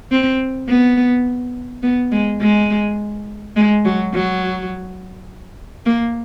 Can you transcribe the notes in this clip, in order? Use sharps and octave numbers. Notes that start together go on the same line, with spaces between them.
C4
B3
B3
G#3
G#3
G#3
F#3
F#3
A#3